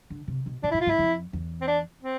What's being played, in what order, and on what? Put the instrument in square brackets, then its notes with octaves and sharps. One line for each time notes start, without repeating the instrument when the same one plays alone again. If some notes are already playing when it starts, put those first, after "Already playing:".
[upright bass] D3
C3
B2
[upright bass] A2 [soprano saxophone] D4
[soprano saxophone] E4
[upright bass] A2
[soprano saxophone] F4
[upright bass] G#2 [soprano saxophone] E4
[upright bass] F2
E2
[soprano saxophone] C4
D4
C4